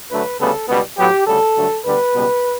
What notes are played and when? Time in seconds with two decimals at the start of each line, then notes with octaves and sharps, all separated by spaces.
0.10 D2 D3 F#3 A3 B4
0.39 D2 C#3 G3 B3 A4
0.68 C#2 B2 G3 B3
0.97 A2 F#3 B3 G4
1.26 D2 C#3 G3 A4
1.55 G2 D3 F#3 A3
1.84 D2 D3 G3 B3 B4
2.13 C#2 B2 G3 B3